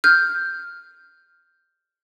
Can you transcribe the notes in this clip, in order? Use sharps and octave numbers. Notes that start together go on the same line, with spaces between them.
F6 G6